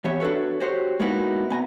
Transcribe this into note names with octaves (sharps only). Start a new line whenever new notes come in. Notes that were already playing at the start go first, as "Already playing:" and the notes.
E3 B3 G4 C#5 E5
D4 F#4 A4 B4 C#5
F#4 G4 C5 C#5
G#3 A#3 B3 D#4 E4 F#4
C2 B3 G#5 A#5